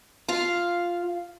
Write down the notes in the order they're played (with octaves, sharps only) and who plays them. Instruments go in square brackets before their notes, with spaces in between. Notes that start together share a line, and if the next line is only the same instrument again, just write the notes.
[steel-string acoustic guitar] F4 F5